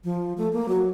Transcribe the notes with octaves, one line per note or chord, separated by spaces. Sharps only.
F3
A3
A#3
F#3